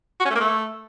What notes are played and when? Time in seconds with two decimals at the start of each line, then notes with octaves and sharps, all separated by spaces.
0.20 F#4
0.25 C#4
0.30 A3
0.35 A#3
0.40 A3